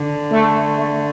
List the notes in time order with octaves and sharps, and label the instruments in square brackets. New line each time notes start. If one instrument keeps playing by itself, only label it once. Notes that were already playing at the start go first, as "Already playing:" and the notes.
Already playing: [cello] D3
[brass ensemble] A3
A3